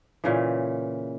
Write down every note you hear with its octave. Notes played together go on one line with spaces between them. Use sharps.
A#2 C#3 E3